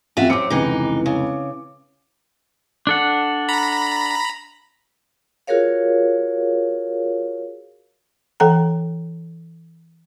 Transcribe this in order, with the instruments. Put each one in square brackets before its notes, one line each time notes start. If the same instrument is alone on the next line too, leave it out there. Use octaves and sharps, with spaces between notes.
[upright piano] A1 F2 [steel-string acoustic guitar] F4 F#4 E5
[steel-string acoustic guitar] F#2 C4 [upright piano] D6 C#7
[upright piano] F1 C#2 [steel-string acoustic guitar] E3 D#4
[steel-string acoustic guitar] C#3
[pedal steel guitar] D4 A4 F#5
[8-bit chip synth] A#5 B5
[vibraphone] F4 F#4 G#4 A#4 C#5 F5
[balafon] E3 A4 F#5 G5 A#5